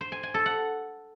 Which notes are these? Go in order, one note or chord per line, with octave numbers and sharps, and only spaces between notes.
C5
G#5
G#5
A4
F#5